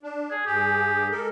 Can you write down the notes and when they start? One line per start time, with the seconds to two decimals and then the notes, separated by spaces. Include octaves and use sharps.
0.03 D4
0.31 G#4
0.46 G2 G4 G#4
1.11 G#3 A4 A#4